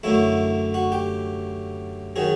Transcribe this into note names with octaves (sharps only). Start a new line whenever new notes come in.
F#2 D3 F#3 A3 E4
F#4
G4
D#3 F#3 G#4